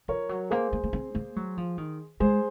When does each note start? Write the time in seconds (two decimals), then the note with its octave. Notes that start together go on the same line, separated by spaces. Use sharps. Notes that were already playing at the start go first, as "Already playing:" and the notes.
0.08 F3 A#4 C#5
0.29 F#3
0.50 A#3 G#4 C5
0.73 A#3
0.83 A#3
0.93 C4
1.15 A#3
1.36 F#3
1.57 F3
1.78 D#3
2.20 G#3 G#4 C5